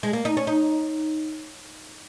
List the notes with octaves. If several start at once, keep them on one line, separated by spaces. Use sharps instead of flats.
G#3
A#3
D#4
C#4
D#4